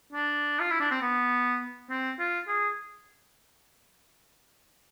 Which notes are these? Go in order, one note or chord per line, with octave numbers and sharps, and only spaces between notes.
D4
F4
E4
D4
C4
B3
C4
F4
G#4